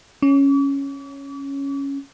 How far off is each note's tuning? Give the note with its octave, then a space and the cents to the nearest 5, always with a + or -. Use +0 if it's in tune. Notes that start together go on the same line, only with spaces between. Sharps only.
C#4 +0 D6 -45